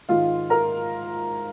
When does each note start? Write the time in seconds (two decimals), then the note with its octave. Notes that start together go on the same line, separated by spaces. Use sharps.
0.09 G#2 D#3 G#3 F4 F5
0.50 A#4 A#5